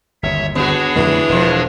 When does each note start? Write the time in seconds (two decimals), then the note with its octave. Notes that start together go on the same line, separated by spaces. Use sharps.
0.23 G1 D#2 C#5 E5
0.55 B3 D4 F#4 G#4 C#5
0.96 F2 D3 E3 A3
1.29 E1 B2 F3